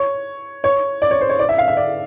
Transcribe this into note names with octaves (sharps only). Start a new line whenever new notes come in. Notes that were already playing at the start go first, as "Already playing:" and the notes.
Already playing: C#5
C#5
D5
C#5
C5
C#5
D5
E5
F5
E5
D5